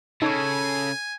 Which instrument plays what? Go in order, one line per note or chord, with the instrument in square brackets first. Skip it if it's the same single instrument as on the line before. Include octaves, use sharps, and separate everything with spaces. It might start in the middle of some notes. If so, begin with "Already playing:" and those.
[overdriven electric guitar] C#3 [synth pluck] D#4 C#6 [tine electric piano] A4 C#5 [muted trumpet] G#5